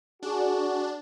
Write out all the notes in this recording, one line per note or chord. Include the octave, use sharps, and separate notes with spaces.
D4 F#4 G#4